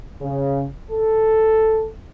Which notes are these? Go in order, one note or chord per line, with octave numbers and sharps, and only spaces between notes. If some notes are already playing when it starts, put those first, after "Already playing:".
C#3
A4